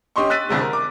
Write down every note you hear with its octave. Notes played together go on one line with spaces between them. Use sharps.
C#4 G4 D#5 C6 C#6
E6 F#6 A6 B6 D#7
C2 F2 D3 G#3
A#4
D6